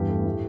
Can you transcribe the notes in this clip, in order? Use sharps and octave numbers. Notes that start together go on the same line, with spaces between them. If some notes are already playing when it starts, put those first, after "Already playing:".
Already playing: E2 G2 G4
A3
A2